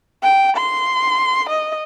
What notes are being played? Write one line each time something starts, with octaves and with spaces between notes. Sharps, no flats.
G5
C6
D#5